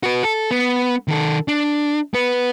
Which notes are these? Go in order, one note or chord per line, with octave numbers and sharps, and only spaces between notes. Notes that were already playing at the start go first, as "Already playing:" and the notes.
F#4 B4
A4
B3
D#3 A4
D4
B3 B4